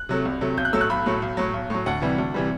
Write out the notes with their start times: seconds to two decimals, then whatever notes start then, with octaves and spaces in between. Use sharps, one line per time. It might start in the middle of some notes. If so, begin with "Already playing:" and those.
Already playing: F#6
0.09 C3 F#3 A3
0.25 C2
0.41 C3 F#3 A3
0.57 B1 G6
0.65 F#6
0.73 A2 F#3 A3 E6
0.81 F#6
0.90 B1 B5
1.06 A2 F#3 A3
1.22 B1
1.37 A2 F#3
1.54 B1
1.70 A2 F#3
1.86 D2 F#5
2.02 C3 E3 G3
2.18 D2
2.34 C3 E3 G3